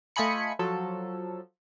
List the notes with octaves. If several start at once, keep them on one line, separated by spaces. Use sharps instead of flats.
A3 F4 D#5 G#5 B5 C#7
F3 F#3 A4